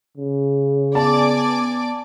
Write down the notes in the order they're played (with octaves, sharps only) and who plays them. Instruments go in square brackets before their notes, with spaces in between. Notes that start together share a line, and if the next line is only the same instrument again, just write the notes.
[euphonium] C#3
[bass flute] B3 [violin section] D5 G#5 D6 [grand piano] A5